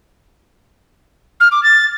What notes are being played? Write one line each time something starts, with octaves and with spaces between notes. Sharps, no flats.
F6
D6
A6